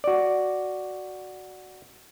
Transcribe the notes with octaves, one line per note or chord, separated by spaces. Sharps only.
F#4 D5